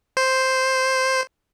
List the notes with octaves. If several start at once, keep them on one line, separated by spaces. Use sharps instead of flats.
C5